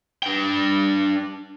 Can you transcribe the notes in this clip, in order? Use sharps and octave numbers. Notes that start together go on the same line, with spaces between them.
D4 G5